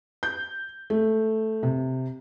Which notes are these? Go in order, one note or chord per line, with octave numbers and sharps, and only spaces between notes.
G6
A3
C3